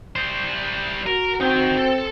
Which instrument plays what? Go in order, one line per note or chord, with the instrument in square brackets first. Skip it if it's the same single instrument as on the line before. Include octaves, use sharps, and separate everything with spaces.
[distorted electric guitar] G3 C5
[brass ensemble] F#4 [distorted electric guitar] A#4
[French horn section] C4 [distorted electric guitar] D#4 G5
[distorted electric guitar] A4